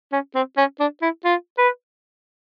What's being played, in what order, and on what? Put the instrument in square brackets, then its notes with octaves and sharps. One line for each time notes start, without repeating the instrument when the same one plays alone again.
[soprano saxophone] C#4
C4
C#4
D4
E4
F4
B4